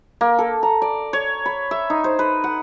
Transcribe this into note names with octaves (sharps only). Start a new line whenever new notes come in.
A#3
A4
A#5
D5
C#5
B5
E5
D#4
C5
B4
F#5